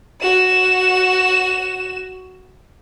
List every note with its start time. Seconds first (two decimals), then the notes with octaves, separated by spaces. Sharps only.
0.21 F#4 E7